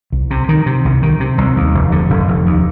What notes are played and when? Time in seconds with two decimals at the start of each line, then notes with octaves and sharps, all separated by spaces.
0.12 C2
0.30 C3
0.49 D#3
0.66 C3
0.85 C2
1.02 D#3
1.20 C3
1.38 C2
1.56 D#2
1.74 F1
1.92 D3
2.10 F1
2.28 F1
2.46 D#2